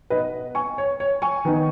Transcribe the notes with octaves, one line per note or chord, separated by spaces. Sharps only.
B2 B3 D#4 B4 D#5
G#5 C#6
C#5
C#5
G#5 C#6
D#3 B3 D#4